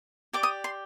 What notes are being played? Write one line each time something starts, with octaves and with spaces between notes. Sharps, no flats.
G4 D5 D6
D#6
C6